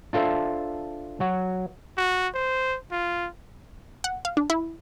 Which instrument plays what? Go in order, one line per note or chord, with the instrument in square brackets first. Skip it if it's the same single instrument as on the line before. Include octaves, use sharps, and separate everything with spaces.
[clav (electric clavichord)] D4 F4 A4 C5 E5
F#3 F#4
[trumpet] F#4
C5
F4
[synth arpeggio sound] F#5
F5
D4
E4